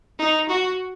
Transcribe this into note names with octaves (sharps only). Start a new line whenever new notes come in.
D#4
F#4